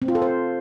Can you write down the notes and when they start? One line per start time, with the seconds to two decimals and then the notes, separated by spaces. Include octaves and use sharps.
0.02 C4
0.08 F4
0.15 A4
0.22 C5